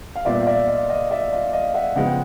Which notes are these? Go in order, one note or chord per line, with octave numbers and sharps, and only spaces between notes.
F5
A#2 G3 B3 D5 E5
F5
D5 E5
D#5 F5
D#5 F5
D5 E5
D#5 F5
D#5 F5
E5 F#5
C#3 F3 G#3 B3 F#5
G5